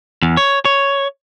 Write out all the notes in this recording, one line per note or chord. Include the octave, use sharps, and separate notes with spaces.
E2
C#5
C#5